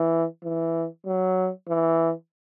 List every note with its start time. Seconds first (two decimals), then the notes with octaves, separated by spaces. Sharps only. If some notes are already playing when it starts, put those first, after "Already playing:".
Already playing: E3
0.44 E3
1.06 F#3
1.69 E3